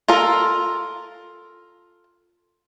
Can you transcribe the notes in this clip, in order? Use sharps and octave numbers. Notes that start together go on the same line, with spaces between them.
F4 A4 A#4